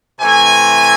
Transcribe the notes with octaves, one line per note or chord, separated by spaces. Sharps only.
C3 E3 A3 C4 G#5